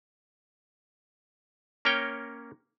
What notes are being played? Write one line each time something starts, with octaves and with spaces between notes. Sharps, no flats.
A#3 C#4 A#4 C#5 G5